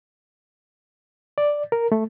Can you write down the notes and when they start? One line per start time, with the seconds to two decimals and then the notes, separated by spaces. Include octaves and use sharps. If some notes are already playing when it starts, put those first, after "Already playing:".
1.38 D5
1.72 A#4
1.92 A3